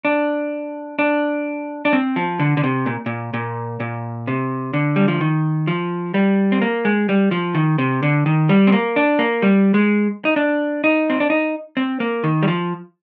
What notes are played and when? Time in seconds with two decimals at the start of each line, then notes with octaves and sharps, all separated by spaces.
0.05 D4
0.99 D4
1.85 D4
1.93 C4
2.16 F3
2.39 D3
2.57 D3
2.64 C3
2.86 A#2
3.06 A#2
3.34 A#2
3.80 A#2
4.27 C3
4.73 D3
4.96 G3
5.08 F3
5.21 D#3
5.67 F3
6.14 G3
6.52 C4
6.62 A#3
6.85 G#3
7.09 G3
7.31 F3
7.55 D#3
7.78 C3
8.03 D3
8.26 D#3
8.49 G3
8.67 C4
8.72 A#3
8.96 D4
9.19 A#3
9.42 G3
9.74 G#3
10.25 D#4
10.36 D4
10.84 D#4
11.10 C4
11.20 D4
11.30 D#4
11.77 C4
12.00 A#3
12.24 D#3
12.43 G3
12.48 F3